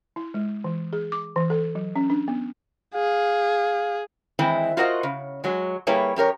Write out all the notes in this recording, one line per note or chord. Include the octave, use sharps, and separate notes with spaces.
E4
G#3
E3
G#4
D6
E3
A4
F#3
C#4
D4
B3
G#4 F5
D#3 E3 G#3 C4 E4
F4 F#4 A#4 C5 D#5 F#5
C#3
F#3 G#3
G3 A#3 E4 G#4 B4 C#5
F#2 G4 A#4 C#5